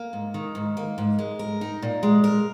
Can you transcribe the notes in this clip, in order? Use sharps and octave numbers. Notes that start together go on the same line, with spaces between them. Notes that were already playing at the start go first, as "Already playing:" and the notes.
Already playing: A#3
G#2
D#3
G#2
A#3
G#2
G#3
A#4
D#4
A#2
G#3
A#4